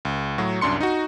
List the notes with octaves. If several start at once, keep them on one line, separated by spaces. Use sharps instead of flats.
C#2
A2 F#3 F#4
C2 F#2 D4 C6 C#7
D#4 F#4